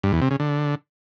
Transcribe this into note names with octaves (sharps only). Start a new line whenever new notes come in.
G2
E2
C3
C#3
D3